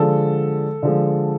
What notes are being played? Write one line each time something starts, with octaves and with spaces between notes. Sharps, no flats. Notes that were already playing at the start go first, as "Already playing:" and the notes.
Already playing: D3 F3 G#3 A4
D3 F3 G#3